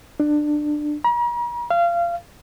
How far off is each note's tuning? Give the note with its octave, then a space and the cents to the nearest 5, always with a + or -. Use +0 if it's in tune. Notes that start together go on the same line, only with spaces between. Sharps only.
D4 +20
A#5 +45
F5 -25